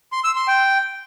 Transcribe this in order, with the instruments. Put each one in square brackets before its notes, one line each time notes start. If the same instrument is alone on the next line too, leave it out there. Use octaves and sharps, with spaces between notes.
[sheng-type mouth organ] C6
E6
C6
G5